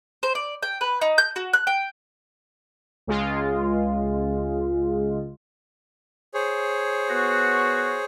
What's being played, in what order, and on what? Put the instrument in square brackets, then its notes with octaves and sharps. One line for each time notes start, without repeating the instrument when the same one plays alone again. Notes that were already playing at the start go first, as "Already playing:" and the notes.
[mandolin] C5
D5
G5
B4
D#4
G6
F#4
F#6
G5
[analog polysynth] C#2 G#3 F4
[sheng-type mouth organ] G#4 C5 C#5
[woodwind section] B3 F#4